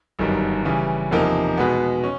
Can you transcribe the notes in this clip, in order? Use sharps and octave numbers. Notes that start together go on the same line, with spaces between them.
G1 F#2 D#3 G3
C#3 E3 G3
E2 C3 F3 A#3 D#4
B2 G#3 B3
C#4